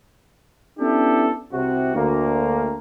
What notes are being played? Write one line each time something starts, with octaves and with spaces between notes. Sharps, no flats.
B3 C#4 D4 E4 G4 A4
C2 C3 F#4
D2 A#3